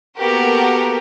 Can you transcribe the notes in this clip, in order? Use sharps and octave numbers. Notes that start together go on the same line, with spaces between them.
A#3 B3 F#4 G4 A4 A#4